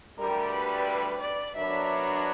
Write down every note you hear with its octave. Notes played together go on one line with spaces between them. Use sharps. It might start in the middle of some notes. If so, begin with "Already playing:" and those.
D2 D3 G3 A#4
B4
D5
F#3 B3 D4 A#4 C#5 E5